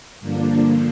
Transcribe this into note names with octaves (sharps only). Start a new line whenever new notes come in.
G2 D3 F3 A#3 D4